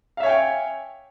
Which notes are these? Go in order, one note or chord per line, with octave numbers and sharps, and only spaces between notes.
C#5 E5 F5 G5 G#5